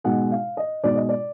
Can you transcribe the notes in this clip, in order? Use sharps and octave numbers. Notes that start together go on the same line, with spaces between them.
B2 G#3 D#4 F#5
F5
D#5
B2 G#3 D#4 D5
D#5
D5